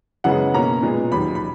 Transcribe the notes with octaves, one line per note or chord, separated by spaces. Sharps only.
F#2 C#3 E3 G#3 B3 F#5
B2 A#3 C#4 A#5
A#2 G#3 B3
D#2 D#3 F#3 B5
B5